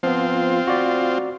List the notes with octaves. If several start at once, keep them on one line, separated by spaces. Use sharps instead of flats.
F3 B3 C4 F4
F#4 D5